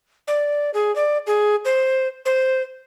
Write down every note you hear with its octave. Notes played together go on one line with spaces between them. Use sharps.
D5
G#4
D5
G#4
C5
C5